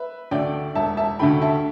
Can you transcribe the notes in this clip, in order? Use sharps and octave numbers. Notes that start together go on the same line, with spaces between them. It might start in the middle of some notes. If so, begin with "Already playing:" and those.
Already playing: B4 E5
D2 D3 A3 D5 G5
E1 E5 A5
E5 A5
D2 D3 A3 G5 B5
E5 A5